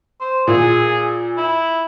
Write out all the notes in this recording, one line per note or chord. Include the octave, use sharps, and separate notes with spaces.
C5
A#2 G#4
E4